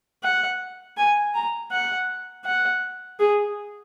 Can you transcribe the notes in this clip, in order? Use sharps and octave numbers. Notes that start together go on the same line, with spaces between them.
F#5
G#5
A#5
F#5
F#5
G#4